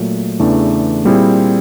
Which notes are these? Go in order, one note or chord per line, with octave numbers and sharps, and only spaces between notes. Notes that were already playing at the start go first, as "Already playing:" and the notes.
Already playing: A#2 F#3 A3
E2 C#3 E3 A3 D4
A#2 G3 C4 E4 G#4